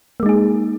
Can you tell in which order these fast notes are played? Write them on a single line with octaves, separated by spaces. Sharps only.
A#3 G#3 D#4 G#4